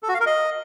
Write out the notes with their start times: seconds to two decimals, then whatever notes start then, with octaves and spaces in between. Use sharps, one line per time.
0.03 A4
0.09 F#4
0.14 F5
0.20 A#4
0.26 D#5